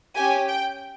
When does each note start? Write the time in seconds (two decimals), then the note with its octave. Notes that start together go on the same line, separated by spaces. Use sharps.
0.16 C#4 G4 G#5
0.48 G5